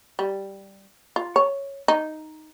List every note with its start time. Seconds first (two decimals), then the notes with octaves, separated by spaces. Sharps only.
0.19 G3
1.16 F4
1.36 C#5
1.88 D#4